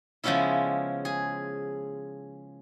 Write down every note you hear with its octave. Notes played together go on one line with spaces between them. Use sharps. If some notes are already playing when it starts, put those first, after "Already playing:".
C#3 F3 G#3 B3 C#4 E4
G#4